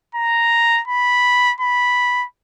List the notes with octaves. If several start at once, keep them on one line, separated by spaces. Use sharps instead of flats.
A#5
B5
B5